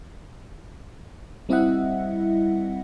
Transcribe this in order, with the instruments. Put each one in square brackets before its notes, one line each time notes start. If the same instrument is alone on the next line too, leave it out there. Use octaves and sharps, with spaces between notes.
[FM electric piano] G3 C4 E4 D#5 E5 F#5